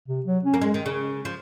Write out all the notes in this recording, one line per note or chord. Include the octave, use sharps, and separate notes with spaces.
C3
F#3
C#4
A#3
G#3
D#3
C#3
F3